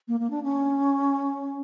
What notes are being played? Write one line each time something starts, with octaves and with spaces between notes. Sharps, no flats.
A#3
A#3
D4
C#4